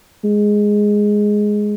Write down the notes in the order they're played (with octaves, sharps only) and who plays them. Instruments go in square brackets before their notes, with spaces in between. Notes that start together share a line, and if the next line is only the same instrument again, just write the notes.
[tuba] G#3